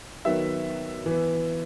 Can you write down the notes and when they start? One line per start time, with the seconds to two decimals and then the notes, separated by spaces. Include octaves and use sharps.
0.25 D#3 F#3 B3 E5
1.06 E3 B3